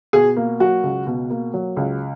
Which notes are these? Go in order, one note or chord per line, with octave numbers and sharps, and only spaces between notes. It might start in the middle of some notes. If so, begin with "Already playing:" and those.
B2 G#4
A#3
F#3 F#4
C#2
B2
A#3
F#3
C#2